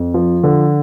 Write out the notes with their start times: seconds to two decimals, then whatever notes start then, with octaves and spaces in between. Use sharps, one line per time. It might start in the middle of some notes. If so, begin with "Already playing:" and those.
Already playing: F2
0.14 F3
0.43 D3